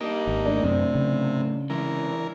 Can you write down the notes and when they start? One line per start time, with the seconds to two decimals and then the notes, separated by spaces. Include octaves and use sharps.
0.01 A#3 D4 D#4 G4
0.27 G#1
0.46 A2 F#3 D4
0.64 F#2 C3 C4
0.95 C#3
1.70 C3 E3 G#3 A#4